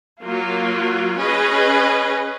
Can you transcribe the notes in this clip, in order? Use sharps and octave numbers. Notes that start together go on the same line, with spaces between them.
F#3 A#3 F4
C#4 G#4 B4 D#5